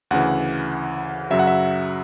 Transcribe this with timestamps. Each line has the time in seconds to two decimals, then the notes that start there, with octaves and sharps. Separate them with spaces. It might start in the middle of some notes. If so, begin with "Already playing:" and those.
0.11 D2 C#3 E3 F#5
1.30 F#2 C#3 F#3 E5
1.39 F#5
1.47 E5